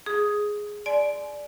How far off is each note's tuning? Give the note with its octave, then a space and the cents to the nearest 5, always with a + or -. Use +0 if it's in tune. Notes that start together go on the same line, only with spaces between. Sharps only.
G#4 +0 D#6 +5
D5 +0 G#5 +35 C6 -15